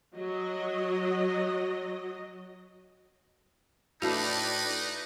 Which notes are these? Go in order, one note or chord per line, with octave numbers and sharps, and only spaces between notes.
F#3 D#5
A2 A3 D4 D#4 F#4 B4 D5